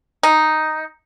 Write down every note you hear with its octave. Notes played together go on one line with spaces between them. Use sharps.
D#4